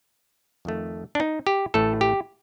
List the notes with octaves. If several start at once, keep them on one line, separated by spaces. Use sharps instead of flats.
F2 D#3 A3
D4
D#4
G4
A1 A2 A3 A4
G4